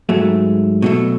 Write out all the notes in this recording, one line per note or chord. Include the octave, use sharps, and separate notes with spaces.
G#2 F#3 A3
B2 F#3 A3